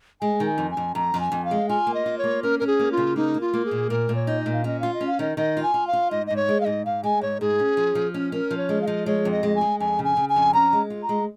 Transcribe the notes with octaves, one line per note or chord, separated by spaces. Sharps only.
G#3 G#5
D#3
G#5
F2
G#5
F2
F2 A#5
F2
G#5
F2
F5
G#3
F4 G#5
A#3
D#5
F4
C#5
A#3
C#4 A#4
C#4 A#4
G#4
A#3
F4
C#3
A#3 D#4
A#3
F4
A#3
G#4
A#2
A#2 A#4
A#2
C#5
D#4
D#5
A#2
F5
C#4 D#5
F4 F5
D#5
C#4
F5
D#3 D#5
D#3 D#5
F4
G#5
F4
F5
F4
G#2 D#5
G#2 D#5
C#5
G#3
F5
G#2 D#5
G#2 F5
G#3 G#5
G#2 C#5
G#2 G#4
C#4
F3
F3
C#4
C#4 A#4
F3
C#5
G#3
F5
F3 D#5
G#3 C#5
F2
D#5
G#3
G#5
G#3
F2 G#5
C#3
G#5
C#3
G#5
F2
C#4 A#5
G#3
F4
A#5
G#3